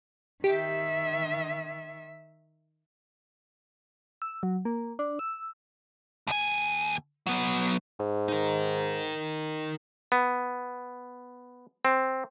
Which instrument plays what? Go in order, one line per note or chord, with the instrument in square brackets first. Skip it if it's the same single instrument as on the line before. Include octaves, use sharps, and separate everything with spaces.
[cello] D#3 E5 [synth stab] G4
[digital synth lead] E6
F#3
A#3
D4
E6
[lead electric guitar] D#2 G#5
F#3 B3
[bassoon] G#2
[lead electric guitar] D#4 A#4
[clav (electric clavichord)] B3
C4